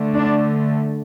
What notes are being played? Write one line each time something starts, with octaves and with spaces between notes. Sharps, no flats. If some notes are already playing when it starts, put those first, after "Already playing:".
Already playing: D3 A3
D4